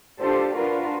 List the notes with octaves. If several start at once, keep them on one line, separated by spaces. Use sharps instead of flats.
D4 F4 G4 A4 C5
D4 F4 F#4 A#4 B4